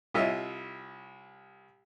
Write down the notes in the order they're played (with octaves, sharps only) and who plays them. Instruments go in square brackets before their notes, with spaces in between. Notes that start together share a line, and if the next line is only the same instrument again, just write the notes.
[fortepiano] C2 F4 C#5 D#5 E5 E6